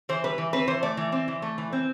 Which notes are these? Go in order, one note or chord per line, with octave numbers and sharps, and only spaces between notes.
E3 C5
G3 B4
E3
C4 B4
E3 C5
A3 D5
E3
C4
E3
A3
E3
C4